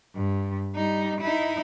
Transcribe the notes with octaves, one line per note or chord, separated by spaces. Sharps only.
G2
G3 D#4
D#4 E4